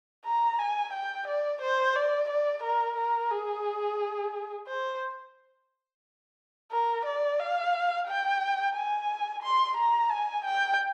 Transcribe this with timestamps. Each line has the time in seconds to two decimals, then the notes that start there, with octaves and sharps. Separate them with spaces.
0.25 A#5
0.59 G#5
0.93 G5
1.27 D5
1.62 C5
1.95 D5
2.29 D5
2.63 A#4
2.96 A#4
3.30 G#4
4.67 C5
6.71 A#4
7.05 D5
7.39 F5
8.07 G5
8.75 G#5
9.42 C6
9.77 A#5
10.10 G#5
10.45 G5